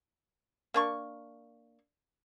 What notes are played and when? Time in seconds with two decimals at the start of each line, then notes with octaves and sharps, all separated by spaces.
0.74 A#3 D4 C#6